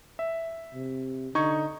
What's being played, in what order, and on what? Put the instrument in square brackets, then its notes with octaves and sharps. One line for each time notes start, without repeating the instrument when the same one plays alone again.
[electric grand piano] E5
[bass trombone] C3
[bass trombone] D3 [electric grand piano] D#4 C#6 G#6